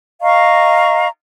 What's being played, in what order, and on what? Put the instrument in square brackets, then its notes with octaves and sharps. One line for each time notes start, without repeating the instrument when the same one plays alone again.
[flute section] D#5 F5 A#5 C#6